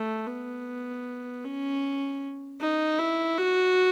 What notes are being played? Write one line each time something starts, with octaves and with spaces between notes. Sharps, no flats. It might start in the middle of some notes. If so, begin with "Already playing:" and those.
Already playing: A3
B3
C#4
D#4
E4
F#4